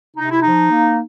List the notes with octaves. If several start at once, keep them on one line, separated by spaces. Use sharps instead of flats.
C3 D#4
E4
F3 D#4
A#3